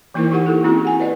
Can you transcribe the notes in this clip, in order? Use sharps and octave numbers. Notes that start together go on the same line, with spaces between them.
E3 A#3 D#4 E4 A#4 C5
D#4 E4 G4 A#4 F#5
G4 A4
A#3 C4 C#4 E4 F#4 G#4
F#5 G#5
B4 D5 D#5